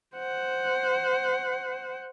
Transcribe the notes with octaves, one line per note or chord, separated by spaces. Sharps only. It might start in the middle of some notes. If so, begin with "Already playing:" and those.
C5 F#5